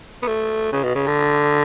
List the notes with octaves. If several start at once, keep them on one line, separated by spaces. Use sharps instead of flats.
B3
A3
C#3
B2
C#3
D3